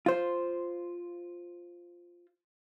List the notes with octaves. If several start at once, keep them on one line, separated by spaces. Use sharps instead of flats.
F4 C5